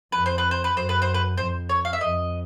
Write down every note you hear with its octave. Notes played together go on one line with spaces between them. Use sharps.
F2 B4
C5
B4
C5
B4
F#2 C5
B4
C5
B4
F2 C5
C#5
F5
E5
F2 D#5